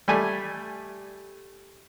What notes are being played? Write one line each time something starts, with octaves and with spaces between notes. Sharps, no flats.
G3 A3 G#5